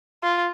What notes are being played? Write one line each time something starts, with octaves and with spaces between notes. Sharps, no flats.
F4